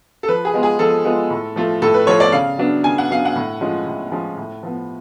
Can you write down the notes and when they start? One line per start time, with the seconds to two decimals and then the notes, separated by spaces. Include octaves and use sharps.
0.23 A4
0.28 F3 B4
0.45 G#4
0.54 G#3 B3 F4
0.63 G#4
0.79 F3 A4
1.05 G#3 B3 F4
1.30 A2
1.56 F3 A3 F4
1.82 A2 A4
1.94 B4
2.07 F3 A3 F4 C#5
2.20 D5
2.32 C#3 F5
2.58 F#3 B3 D4
2.84 C#3 G#5
2.98 F#5
3.10 F#3 B3 D4 F5
3.25 F#5
3.36 A2
3.61 F3 G#3 C#4 F4
3.86 A2
4.12 F3 G#3 C#4 F4
4.37 A2
4.63 F3 B3